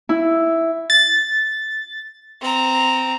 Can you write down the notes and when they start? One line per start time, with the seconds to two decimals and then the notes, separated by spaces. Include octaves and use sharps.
0.09 E4
0.90 A6
2.41 C4 A#5